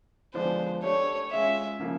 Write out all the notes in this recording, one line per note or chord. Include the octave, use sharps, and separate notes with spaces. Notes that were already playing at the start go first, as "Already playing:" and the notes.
D3 F3 G#3 B3 D4 C5
A3 D4 G4 C#5
G#3 C#4 F4 G#4 E5
C#3 F3 A#3